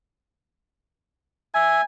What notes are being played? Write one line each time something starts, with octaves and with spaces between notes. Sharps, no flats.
E5 G#5